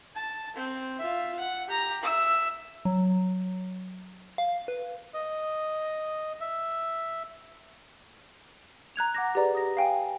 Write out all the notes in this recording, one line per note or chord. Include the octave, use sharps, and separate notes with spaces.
A5
C4
F4 E5
F#5
G4 A#5
E5 E6
F#3
F5
B4
D#5
E5
A#5 F#6 G#6 F7
F#5 D6 A#6
G4 G#4 B4 D5 A#5
D#6 A#6
F5 G5 G#5